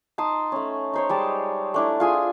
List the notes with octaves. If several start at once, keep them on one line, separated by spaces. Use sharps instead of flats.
D#4 A5 C6 D#6
A3 C#4
D#4 C5 C#5
G3 G#3 A5
A3 D4 E4
F4 G#4 G#5